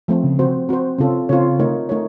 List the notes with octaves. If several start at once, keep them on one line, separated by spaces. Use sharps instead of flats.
F3 A3 C4
C#3
C4 F#4 C5
C4 F#4 C5
C#3 C4 F4 A4 C#5
C#3 C4 F4 A4 C#5
A3 D#4 A#4 C#5
A3 D#4 A#4 C#5